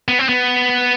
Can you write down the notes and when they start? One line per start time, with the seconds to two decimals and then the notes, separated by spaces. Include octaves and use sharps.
0.08 B3
0.19 C4
0.29 B3